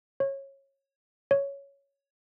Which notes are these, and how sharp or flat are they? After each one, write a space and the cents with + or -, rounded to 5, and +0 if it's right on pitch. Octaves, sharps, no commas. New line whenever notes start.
C#5 -20
C#5 +5